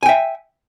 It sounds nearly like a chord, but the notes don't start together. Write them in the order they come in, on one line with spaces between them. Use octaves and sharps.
G#5 G5 E5